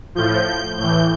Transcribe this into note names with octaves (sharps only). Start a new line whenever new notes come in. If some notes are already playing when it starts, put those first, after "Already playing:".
A2 F3 G6
A2 E3 G6